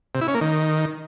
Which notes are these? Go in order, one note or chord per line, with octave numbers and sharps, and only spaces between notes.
C3
E4
C#4
A#3
D#3